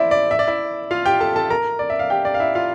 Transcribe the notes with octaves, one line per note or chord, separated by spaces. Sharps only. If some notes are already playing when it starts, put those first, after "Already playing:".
Already playing: E4 C5 D5 E5
D5
E5
D5
E4 E5
F4 F5
G4 G5
A4 A5
A4 A5
A#4 A#5
D5
E5
F5
G4 G5
D5
F5
E4 E5
F4 F5